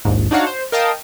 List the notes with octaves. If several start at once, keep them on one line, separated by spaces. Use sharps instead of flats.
A#1 D#2 G#2
D4 D#4 F#4 C#5 F5 F#5
C5
A#4 D#5 F5 G5 A5 D#6